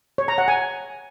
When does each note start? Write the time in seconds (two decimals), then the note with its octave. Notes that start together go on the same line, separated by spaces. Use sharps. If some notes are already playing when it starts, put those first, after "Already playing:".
0.18 C#5
0.28 A#5
0.38 F#5
0.48 G#5